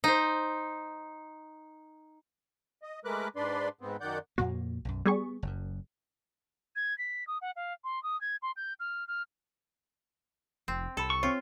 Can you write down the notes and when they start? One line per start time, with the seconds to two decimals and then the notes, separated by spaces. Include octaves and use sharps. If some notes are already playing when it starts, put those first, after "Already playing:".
0.04 D#4 C5
2.83 D#5
3.05 G#3 A3 A#4 B4 D6 F#6
3.36 G#2 D4 B4 D5 C6
3.81 G#2 B3 C4
4.01 F#2 D#3 D5 F#5 G6
4.38 F2 A#2 A#3 F#4
4.85 B1 F#2
5.06 G3 B3 G#4 C#6
5.43 F#1 F#2
6.76 G#6
6.98 B6
7.27 D#6
7.41 F#5
7.56 F5
7.84 C6
8.03 D#6
8.21 G#6
8.42 C6
8.56 G6
8.80 F6
9.08 F6
10.68 F1 C4
10.97 C2 A4 A5 B5
11.10 C#6
11.23 C4 F4 C5 C#5